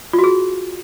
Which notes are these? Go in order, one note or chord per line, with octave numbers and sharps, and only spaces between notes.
F4
F#4
G#4